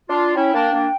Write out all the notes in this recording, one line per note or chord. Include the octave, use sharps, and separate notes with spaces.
D4 F4
C#4 E4 G5
A#3 D4
A#3 D4